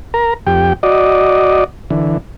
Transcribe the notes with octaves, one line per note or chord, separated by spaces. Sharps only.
A#4 A#5
F2 G4 G5
F#4 D5 D#5
D3 E3